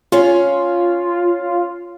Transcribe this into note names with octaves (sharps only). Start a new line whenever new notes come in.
C#4 F4 C#5 F5